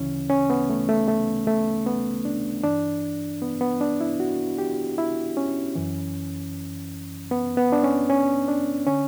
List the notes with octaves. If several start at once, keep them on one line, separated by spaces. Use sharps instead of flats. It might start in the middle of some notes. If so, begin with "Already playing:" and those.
Already playing: D2 C#3 E3 C#4
C#4
B3
A3
A3
A3
A3
B3
D4
G2 E3 D4
B3
B3
D4
E4
F#4
G4
E4
C#4
F#2 E3
B3
B3
D4
C#4
C#4
D4
D3 C#4